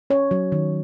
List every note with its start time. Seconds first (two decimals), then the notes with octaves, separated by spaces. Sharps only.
0.10 C#4 C#5
0.31 F#3
0.52 D#3